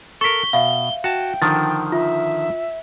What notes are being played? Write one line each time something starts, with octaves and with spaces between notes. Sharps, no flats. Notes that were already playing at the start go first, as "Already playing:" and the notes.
A4 A#4 C#6 B6 G7
B2 E5 F5
F#4 G5 A5
D3 D#3 F3 A6
F4 E5